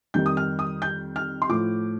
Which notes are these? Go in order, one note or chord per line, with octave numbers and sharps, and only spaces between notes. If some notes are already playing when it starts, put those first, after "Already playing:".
F2 D#3 G3 G6
D#6
F6
D#6
G6
F6
C6
A2 F3 A3 D6